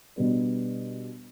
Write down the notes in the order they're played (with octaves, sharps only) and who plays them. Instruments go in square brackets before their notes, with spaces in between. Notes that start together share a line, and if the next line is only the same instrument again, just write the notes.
[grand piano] B2 G3 B3 D4